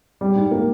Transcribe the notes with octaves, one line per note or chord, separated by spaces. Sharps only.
G3
G#2
A#3